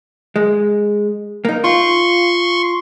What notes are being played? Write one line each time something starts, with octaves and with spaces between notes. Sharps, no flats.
G#3
A#3 D#4
F4 C6 C#6